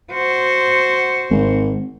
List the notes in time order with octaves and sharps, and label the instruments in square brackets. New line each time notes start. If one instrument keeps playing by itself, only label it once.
[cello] F#4 C5
[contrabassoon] G#1